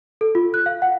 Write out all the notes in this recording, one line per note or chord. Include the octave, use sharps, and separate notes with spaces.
A4
F4
F#6
F5
F#5